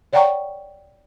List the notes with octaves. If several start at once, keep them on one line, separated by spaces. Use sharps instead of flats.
C#5 D5 F#5 G5 A#5 C#6